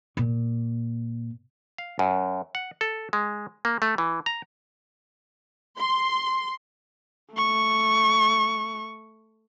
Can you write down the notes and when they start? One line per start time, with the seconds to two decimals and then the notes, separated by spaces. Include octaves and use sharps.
0.17 A#2
1.78 F5
1.99 F#2
2.55 F#5
2.81 A4
3.13 G#3
3.65 A#3
3.82 A3
3.98 E3
4.26 A#5
5.77 C6
7.35 A3 C#6